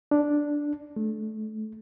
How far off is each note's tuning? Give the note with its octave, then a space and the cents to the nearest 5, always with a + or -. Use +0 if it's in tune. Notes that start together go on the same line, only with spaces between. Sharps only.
D4 -5
A3 -25